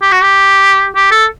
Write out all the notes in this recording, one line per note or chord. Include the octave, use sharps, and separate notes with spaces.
G4
F#4
G4
G4
A4